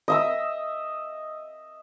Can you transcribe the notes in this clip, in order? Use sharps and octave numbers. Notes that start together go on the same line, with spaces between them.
D#5 E5 E6